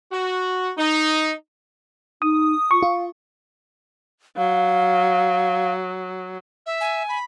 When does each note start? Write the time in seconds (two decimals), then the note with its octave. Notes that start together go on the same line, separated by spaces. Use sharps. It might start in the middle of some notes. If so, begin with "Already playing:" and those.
0.12 F#4
0.78 D#4
2.22 D#4 D#6
2.71 F4 C#6
2.83 F4 F5
4.37 F#3 F5
6.66 E5
6.81 G#5
7.08 B5